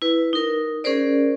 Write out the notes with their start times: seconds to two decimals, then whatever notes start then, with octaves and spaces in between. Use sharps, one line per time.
0.02 E4 B4
0.33 D#4 A#4
0.84 C#4 G#4 A#4 C5 D5